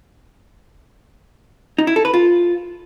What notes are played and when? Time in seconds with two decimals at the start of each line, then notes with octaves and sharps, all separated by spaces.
1.78 D#4
1.87 E4
1.96 A4
2.05 B4
2.14 F4